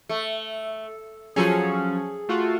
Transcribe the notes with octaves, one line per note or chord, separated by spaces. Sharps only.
A3
F3 F#3 C#4 G#4 A4
A3 F4 F#4